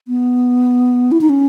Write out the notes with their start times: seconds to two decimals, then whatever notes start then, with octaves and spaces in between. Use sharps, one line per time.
0.08 B3
1.12 E4
1.21 D#4
1.29 C#4